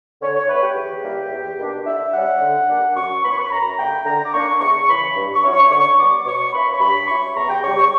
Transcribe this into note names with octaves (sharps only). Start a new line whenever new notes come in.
D3 C#5
C#5
F#3 B3 E4 B4
G4
E2
C#3 G3 A#3 E4
E2
B2 A#3 D4
D3 E5
G3 C#4 F#5
D3
G3 A#3 D4
F#2 C#6
E3 B3 B5
C#6
B5
F#2 A#5
D3 A#3 E4 G5
D3 A#5
D6
A#3 D4 C#6
E2 C#6
C#3 E3 B5
G2
C#6
F#3 C#4 E4
C#6
D3 C#6
G3 B3 D6
B2 C#6
A#3 C#4 E4 B5
C#6
G2 B5
F#3 C#4 E4 C#6
E2 A#5
G5
C#3 G3 C#6
C#6